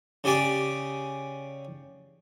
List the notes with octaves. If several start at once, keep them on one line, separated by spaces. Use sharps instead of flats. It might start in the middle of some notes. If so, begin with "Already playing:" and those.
C#3 G4 G#4 D5 D6